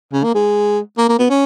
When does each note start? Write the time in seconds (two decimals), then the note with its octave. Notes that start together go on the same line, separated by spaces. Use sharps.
0.13 C#3
0.24 A#3
0.35 G#3
0.98 A#3
1.09 A#3
1.19 B3
1.30 C#4